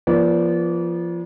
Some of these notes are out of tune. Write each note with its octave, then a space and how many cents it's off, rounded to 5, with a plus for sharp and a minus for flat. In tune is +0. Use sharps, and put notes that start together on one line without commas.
F3 -25 B3 -45 D5 -30